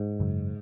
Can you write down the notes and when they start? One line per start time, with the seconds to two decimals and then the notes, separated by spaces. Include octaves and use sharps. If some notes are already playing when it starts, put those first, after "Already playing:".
Already playing: G#2
0.20 F#2 C#3 F#3